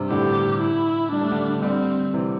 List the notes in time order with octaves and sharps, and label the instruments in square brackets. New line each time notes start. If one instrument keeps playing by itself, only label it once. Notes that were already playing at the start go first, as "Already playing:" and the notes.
Already playing: [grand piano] G2 C3
[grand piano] A2 D3 [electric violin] G4
[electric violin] E4
[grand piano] G3 [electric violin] D4
[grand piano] A3
D3 G3
[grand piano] D3 G3 [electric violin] C4
[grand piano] C3 E3